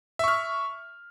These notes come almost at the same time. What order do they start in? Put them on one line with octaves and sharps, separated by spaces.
E5 C#6 F6